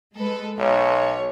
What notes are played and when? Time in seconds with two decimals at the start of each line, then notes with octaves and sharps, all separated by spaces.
0.15 G#3 A4 B4
0.59 B1 C#5